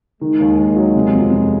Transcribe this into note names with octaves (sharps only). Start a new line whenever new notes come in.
D#3 G#3
D#2
D#2
F#3
C3
F2
F2